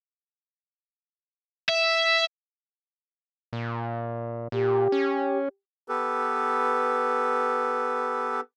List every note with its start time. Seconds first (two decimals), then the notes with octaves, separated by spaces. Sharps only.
1.69 E5
3.53 A#2
4.52 A#2 G4
4.92 C#4
5.88 B3 G4 A4 B4